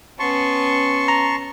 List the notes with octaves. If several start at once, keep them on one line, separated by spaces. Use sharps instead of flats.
B3 C#4 A5 C6 C#6
A#5